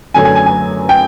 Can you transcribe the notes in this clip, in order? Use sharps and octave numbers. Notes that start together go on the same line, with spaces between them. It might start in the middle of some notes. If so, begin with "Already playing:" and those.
F#2 D3 F#3 A3 G#5
G#5
G#5
G#5
G5